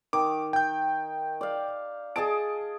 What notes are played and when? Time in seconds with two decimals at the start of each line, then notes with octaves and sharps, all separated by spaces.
0.13 D#3 D6
0.53 G5 G6
1.41 D5 F5
2.16 G#4 D#5 A5 D7